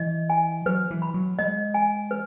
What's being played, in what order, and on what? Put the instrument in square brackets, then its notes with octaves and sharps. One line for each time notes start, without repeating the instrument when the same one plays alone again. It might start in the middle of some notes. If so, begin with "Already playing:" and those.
Already playing: [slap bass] E3 [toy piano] D#5
[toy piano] G#5
[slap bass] F#3 [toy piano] B4
[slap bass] E3
[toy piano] B5
[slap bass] F#3
[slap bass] G#3 [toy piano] D#5
[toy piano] G#5
B4